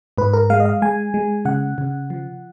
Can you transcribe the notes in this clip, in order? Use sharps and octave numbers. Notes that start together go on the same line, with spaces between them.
G#2 B4
A#4
G#3 F5
D#5
F5
G#3 G#5
G#3
C#3 F#5
C#3
F3